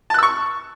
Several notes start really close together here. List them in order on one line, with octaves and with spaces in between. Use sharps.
A5 F#6 E6 C#6